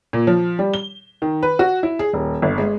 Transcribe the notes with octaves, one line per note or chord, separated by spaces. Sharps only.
A#2
F3
G3
G7
D#3
B4
F#4
E4
G#4
D#1
G1
G#3